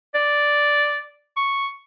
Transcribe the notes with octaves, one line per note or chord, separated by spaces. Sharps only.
D5
C#6